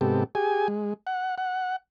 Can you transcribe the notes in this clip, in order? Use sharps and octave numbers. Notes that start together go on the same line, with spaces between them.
G#2 C3 B3 G4 A4
G4 G#4 G#5
G#3
F#5
F#5